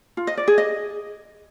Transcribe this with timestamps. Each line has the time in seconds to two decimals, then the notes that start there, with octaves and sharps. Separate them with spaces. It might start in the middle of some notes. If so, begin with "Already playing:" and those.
0.17 F4
0.27 D#5
0.37 D5
0.48 G#4
0.58 D#5